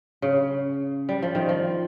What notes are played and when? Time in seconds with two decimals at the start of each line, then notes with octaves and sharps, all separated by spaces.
0.22 C#3
1.09 G3
1.22 F3
1.35 D#3
1.49 F3